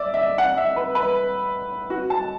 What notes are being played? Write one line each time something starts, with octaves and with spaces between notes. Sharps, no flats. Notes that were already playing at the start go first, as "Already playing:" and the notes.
Already playing: D5 E5
E5
F#5
E5
B4
B4
F#4
A5